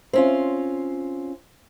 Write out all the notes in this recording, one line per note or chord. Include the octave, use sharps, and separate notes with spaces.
C4 C#4 F4